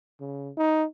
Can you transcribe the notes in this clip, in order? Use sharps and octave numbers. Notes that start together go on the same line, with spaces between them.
C#3
D#4